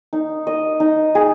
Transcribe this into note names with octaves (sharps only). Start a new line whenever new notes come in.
D#4
D#5
D#4
G#4